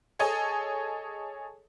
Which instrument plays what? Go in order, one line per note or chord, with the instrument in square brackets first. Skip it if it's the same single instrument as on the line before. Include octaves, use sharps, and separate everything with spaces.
[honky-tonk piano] G#4 A4 C#5 D#5 G#5 A5